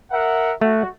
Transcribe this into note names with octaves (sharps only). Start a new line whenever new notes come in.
A#4 E5 F#5
A3 F#4